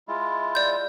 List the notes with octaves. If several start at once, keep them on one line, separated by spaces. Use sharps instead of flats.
G#3 E4 F4
D5 G6